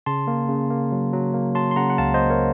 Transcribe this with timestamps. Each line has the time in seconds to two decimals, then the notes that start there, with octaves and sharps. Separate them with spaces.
0.06 C#3 A5 C6
0.27 A#3
0.49 C#3
0.70 A#3
0.92 F#3
1.13 F#3
1.34 A#3
1.55 F#3 A5 C6
1.71 C6
1.76 C#3 F#5 A#5
1.90 F#5
1.98 C#2 F5 A5
2.14 C5 D#5
2.19 A#3
2.30 A#4 C#5